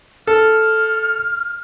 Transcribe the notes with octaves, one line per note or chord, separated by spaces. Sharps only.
A4 F6